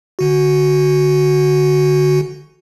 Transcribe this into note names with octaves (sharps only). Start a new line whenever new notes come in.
G1 D3 F#4